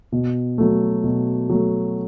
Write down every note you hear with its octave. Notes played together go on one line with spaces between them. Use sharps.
B2
F#3 A3
B2
F#3 A3